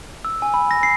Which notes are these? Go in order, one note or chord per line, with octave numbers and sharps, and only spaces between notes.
E6
G#5
B5
A#6
C7